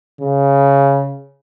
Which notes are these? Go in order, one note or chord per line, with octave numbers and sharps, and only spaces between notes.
C#3